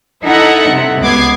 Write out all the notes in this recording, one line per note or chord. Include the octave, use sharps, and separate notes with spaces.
D#4 E4 A4 E5 F#5
C3
C#2 B3 D6 G#6 C7